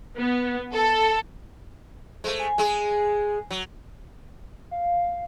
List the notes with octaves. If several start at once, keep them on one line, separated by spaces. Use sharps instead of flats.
B3
A4
G#3 A3 C5
G#5
G#3 G#4
F#3
F5